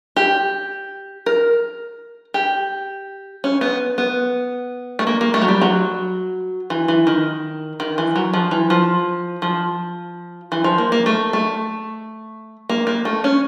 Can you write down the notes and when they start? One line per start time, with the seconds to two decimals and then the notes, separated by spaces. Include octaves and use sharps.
0.16 G4
1.26 A#4
2.34 G4
3.44 C#4
3.61 B3
3.98 B3
4.99 A3
5.07 A#3
5.21 A#3
5.34 A3
5.42 F#3
5.48 G3
5.61 F#3
6.70 E3
6.88 E3
7.07 D#3
7.80 D#3
7.98 E3
8.16 F#3
8.33 F3
8.51 E3
8.70 F3
9.42 F3
10.52 E3
10.64 F3
10.78 A#3
10.92 A#3
11.06 A3
11.33 A3
12.69 A#3
12.87 A#3
13.05 A3
13.24 C#4